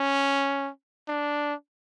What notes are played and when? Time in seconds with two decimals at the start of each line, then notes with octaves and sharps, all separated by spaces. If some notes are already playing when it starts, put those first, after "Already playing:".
Already playing: C#4
1.08 D4